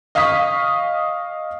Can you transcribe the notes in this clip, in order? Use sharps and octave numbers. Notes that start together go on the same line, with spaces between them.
D#5 F5 C#6 D#6 B6